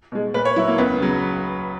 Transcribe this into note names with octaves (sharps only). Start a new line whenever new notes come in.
B2 G#3
A#2 B4
C#5
F#3 E4
A#3
C#2 B3
C#3 F#3